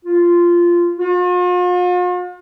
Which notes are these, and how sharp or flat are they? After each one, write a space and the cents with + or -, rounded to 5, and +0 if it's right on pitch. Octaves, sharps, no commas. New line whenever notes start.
F4 -10
F4 +45